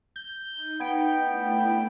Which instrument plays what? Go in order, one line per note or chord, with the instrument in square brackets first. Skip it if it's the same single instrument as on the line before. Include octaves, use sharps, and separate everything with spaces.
[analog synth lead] G6
[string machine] D#4
[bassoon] B3 [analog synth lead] G5
[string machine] A3 D4 E4